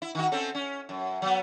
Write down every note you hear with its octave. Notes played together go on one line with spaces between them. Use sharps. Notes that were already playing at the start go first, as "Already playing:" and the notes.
E4
D#3 F#4
C4 C#4 A4
C#4
F#2
F#3 B3